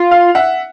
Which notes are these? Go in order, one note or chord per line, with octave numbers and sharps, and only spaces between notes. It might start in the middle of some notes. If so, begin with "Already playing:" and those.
Already playing: F4
F5
E5 F#5